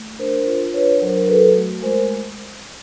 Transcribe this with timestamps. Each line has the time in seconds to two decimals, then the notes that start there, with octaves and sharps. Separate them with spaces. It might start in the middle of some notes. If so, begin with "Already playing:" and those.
Already playing: A3
0.19 D4 A#4 C5
0.46 F4
0.74 D4 B4 C#5
1.01 F#3 A#4 C5
1.17 A#4
1.28 F#4 A4 B4
1.56 A3
1.82 G#3 A#4 C5